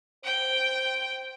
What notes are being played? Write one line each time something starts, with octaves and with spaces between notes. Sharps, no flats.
C5 G5